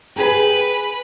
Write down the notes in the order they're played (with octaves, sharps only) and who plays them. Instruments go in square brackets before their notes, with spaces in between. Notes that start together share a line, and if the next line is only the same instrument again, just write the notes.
[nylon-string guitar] G4 G#4 G#5 [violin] B4